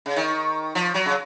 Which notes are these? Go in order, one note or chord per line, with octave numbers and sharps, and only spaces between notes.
C#3
D#3
F3
F#3
C#3